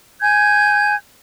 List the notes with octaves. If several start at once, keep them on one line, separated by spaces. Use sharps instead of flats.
G#5 G6 G#6